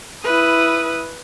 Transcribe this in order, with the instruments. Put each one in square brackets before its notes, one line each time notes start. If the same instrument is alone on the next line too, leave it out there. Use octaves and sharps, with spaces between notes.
[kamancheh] E4 D#6 [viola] B4